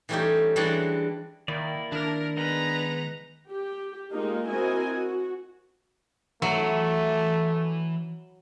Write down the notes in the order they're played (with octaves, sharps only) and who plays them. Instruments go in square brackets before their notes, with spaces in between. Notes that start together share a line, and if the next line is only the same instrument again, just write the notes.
[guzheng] E3 G3 A3 C#4 D#4 G4
E3 G3 G#3 D4 F#4 D5
[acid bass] D#3 [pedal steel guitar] A#3 E4 D5
[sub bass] D#3 [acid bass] D4 [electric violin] A#4
[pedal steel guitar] G#3 B3 D#4 [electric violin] B4 A#5
[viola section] G4
G#3 A#3 D#4 F4 G4
C4 E4 F#4 A#4 D#5 G#5
F#4
[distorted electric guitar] E3 E5 [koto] F#3 [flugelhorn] A3